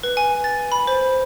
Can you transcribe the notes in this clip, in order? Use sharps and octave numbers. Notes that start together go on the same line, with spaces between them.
B4
G#5
A6
B5
C5